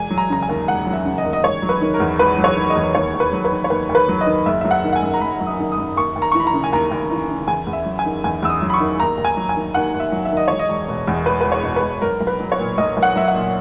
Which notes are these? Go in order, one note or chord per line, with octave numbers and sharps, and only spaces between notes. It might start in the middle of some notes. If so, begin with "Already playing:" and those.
Already playing: E1 G#5
F#3
A#5
C#3 A#5
G#5
D#2
E1 F#5
F#3
E5
C#3
D#5
D#2
D#5
E1 C#5
F#3
B4
D#3
A#4
E2
E1 B4
F#3
C#5
D#3
D#5
E2
D#2 C#5
D#2
B4
F#3
B4
D#3
C#5
D#2 B4
D#2
B4
F#3
D#5
D#3
F#1 E5
F#3 E5
F#5
D#3
F#5
G#5
F#2
A#5
F#1 B5
F#3
D#6
D#3
D#6
F#2
D#2 C#6
D#2
A#5
C#6
E3
B5
A#5
C#3
G#5
D#2 A#5
D#2
E3
C#3
E2 G#5
E2
E5
F#3
G#5
D#3
E2 G#5
E2 E6
D#6
F#3
B5
C#6
D#3
D#2 A#5
D#2
G#5
F#3
G#5
D#3
D#2 F#5
D#2
E5
F#3
E5
D#3
D#5
E1 C#5
D#5
E1
B2
E2
E1 B4
E1 B4
C#5
B2
B4
E2
B1 A#4
B1
B4
F#3
C#5
A#2
B1 D#5
B1
F#5
F#3 E5
F#5
A#2